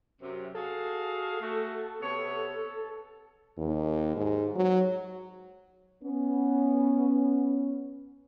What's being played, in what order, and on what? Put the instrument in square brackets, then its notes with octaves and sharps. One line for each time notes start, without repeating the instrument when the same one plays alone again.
[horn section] F#2 C3
[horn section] F#4 G#4 F5 [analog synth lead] A4
[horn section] A3 F#4
C3 B3 C#5
[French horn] D#2
G#2
F#3
[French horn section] B3 C#4